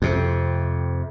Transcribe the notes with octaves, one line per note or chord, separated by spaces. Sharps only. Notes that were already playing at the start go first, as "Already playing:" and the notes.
F2 C3